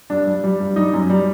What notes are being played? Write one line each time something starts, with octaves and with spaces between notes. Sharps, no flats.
G2 D4
G3
G3
G2
G3 D#4
F#2
G3